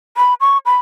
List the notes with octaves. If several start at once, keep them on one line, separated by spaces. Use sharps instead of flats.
B5
C#6
B5